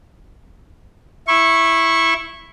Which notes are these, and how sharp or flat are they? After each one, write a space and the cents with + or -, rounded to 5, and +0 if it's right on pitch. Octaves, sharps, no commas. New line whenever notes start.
E4 +0 C#6 -20